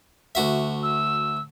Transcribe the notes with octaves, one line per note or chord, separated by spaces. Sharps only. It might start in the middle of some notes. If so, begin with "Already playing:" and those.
D2 F#4 E5
E6